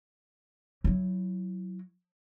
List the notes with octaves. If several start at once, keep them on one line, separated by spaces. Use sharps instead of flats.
F#3 E4